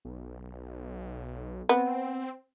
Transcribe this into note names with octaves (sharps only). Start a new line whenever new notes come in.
B1
B3 C4